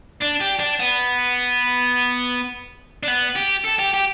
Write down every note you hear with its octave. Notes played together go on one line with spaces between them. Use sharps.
D4
G4
D4
B3
D4
B3
G4
A4
G4
G4